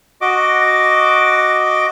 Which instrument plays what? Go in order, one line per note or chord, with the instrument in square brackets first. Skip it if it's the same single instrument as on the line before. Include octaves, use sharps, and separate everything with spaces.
[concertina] F#4 D#5 D6